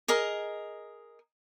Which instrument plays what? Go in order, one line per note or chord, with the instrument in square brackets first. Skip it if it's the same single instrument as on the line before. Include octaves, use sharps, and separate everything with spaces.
[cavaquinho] G#4 A#4 D#5